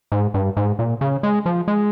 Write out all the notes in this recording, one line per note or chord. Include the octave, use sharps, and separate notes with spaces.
G#2
G2
G#2
A#2
C#3
G#3
F3
G#3